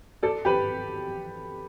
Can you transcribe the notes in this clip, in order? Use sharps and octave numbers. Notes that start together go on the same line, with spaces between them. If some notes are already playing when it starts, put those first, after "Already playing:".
A4 D5
G4 B4